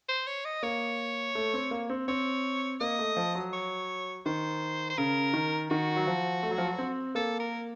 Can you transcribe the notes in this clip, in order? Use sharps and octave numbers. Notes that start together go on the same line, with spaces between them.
C5
C#5
D#5
A#3 C#5
A3
C4
A#3
C4
C4 C#5
A#3 D#5
A3
F3
F#3
C#5
D#3 C5
C5
C#3 A#4
D#3
D#3 F#4
F#3
F3
A3
F#3
F3
F#3
C4
A#3 A4
A#4